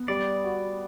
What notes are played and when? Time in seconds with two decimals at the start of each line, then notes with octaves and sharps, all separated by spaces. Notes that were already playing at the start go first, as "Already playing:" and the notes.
Already playing: B3
0.08 G3 D5
0.44 F#4